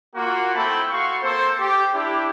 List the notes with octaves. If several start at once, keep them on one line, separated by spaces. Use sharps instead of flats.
A#3 F4 F#4
A3 C4 E4 G5 A5 B5
F#4 F5 C6 C#6
A#3 C4 A4 C5
G4
D4 E4 G4